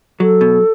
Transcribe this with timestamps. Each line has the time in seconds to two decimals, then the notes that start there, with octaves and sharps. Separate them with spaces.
0.20 F#3 A4
0.41 B2